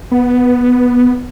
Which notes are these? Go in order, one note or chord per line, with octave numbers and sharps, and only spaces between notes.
B3